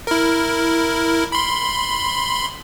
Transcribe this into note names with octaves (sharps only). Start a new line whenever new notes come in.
E4 A#4
B5 C6